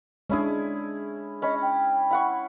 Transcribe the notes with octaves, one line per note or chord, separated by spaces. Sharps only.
G#3 C#4 D4 E4 G#4
C#4 D#5 B5 C#6
G5
E4 F#5 C#6